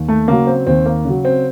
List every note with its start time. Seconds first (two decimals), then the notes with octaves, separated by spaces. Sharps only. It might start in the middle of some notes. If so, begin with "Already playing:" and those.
Already playing: D#2
0.08 A3
0.28 C#3 F#3 A#3
0.47 C4
0.67 D#2 C4
0.86 A#3
1.05 C#3 F#3
1.25 C4